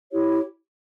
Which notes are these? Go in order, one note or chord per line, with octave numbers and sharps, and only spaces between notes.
E4 G4 C#5